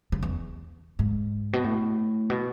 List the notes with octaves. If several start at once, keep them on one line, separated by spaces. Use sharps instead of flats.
C#3
E2
G#2
B2
A2
B2